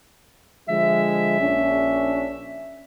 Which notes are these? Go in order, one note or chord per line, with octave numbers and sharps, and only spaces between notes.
D3 F3 G#3 E5
A#1 C#4 D4